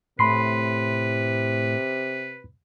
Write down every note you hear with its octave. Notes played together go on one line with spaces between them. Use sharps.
A2 C3 B4 B5 C6 C7